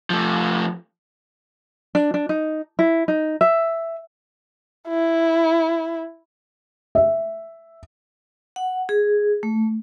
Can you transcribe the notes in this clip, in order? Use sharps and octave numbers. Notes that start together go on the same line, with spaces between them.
F3 A3
D4
D4
D#4
E4
D#4
E5
E4
E5
F#5
G#4
A3